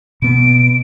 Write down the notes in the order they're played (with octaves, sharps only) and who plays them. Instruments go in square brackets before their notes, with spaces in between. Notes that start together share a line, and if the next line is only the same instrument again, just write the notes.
[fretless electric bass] B2 B3 [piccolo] D7